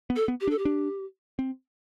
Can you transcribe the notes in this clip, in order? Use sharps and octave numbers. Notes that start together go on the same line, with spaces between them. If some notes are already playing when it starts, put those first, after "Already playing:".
B3
A4
B3
G4
D4
A4
G4
D4
C4